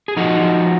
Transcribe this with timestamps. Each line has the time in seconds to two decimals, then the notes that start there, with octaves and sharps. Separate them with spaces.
0.08 G#4
0.17 F3 D#4 F#4
0.41 F3